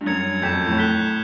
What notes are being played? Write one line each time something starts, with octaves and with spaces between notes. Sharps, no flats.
G2
F#2 G#6 C#7 F7
F2 G6 B6 E7
F#2
A2
F#6 B6 E7 G7